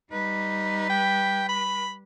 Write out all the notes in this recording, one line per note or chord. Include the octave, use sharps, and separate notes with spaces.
G3 D#4 B4
G5
B5